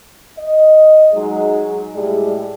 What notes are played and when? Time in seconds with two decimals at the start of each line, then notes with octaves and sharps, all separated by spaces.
0.37 D#5
1.13 F#3 G#3 D#4 G#4
1.94 A2 G3 G#3 G#4